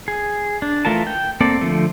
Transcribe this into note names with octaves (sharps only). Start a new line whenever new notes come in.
G#4
D4
E3 A3 F4 A#4 A5
G5
A#3 C4 A4 D5
D3 F3 A3